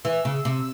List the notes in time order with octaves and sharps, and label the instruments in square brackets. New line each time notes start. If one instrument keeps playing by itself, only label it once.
[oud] E3 [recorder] E6
[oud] C#3
C3